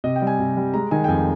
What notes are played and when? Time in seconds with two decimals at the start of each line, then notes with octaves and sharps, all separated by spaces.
0.04 C3 D#5
0.16 G5
0.22 G3
0.27 G#5
0.39 C3
0.57 G3
0.74 G#3 A#5
0.91 D#3 G#5
1.04 G5
1.08 F2 G#5